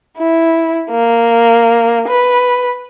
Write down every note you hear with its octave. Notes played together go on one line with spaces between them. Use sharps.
E4
A#3
B4